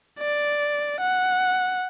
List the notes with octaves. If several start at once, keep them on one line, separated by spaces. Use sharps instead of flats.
D5
F#5